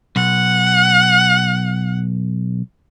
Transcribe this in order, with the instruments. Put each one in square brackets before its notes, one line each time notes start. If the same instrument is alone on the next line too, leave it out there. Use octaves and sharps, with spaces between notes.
[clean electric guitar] B1 [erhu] F#5